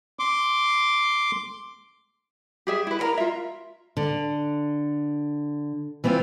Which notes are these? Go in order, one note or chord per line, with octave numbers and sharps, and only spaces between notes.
C6 D6
G4 G#4 E5
E4 B4
E4 A4 A#4 A#5
F4 E5
D3
E3 B3 C4 E4 F4